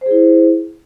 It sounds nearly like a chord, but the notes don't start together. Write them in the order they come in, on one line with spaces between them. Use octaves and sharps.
C5 G#4 E4